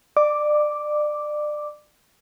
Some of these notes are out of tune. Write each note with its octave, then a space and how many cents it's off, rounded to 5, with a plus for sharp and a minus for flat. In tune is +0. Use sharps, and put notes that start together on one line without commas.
D5 +30 D6 +0